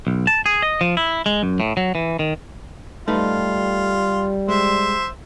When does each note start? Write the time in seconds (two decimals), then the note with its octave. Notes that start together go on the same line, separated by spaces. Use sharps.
0.07 B1
0.27 A5
0.46 G#4
0.62 D#5
0.81 F3
0.97 E4
1.26 G#3
1.43 F#2
1.60 A2
1.77 F#3
1.95 E3
2.19 D#3
3.08 G3 A3 D#4 F4 B4
4.48 G#3 C5 E5